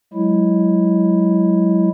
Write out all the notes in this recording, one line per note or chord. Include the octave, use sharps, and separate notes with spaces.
F#3 G#3 E4